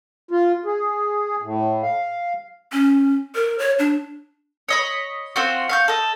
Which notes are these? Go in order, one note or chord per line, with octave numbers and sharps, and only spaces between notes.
F4
G#4
A2
F5
C#4
A#4
C#5
D4
C#5 D#5 B5
C4 F4 F#4
F5 C#6 G6
A4 D#5